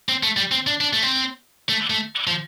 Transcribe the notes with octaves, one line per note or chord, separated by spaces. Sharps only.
C4
A3
G3
C4
D4
D4
A3
C4
A3
A3
F3